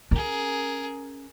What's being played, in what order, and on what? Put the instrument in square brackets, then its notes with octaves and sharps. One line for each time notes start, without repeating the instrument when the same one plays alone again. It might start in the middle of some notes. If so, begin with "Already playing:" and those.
[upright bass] C#4 [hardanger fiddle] G#4 A#4